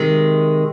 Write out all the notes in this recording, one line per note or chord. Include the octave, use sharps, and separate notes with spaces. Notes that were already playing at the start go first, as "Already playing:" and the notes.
Already playing: C3 D#3 G#3